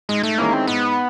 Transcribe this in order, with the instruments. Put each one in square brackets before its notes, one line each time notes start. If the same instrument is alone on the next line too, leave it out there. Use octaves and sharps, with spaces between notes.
[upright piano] G#2 [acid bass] G#3
[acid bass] A3
[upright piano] D#3 G#3 C#4 E4 [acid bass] A#3
[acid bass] C4
[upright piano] G#2 [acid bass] B3